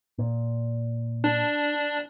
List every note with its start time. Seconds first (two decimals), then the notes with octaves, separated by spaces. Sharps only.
0.18 A#2
1.24 D4